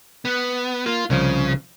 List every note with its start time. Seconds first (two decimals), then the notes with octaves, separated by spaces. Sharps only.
0.25 B3
0.86 A#3 F4
1.10 C2 C#3 F3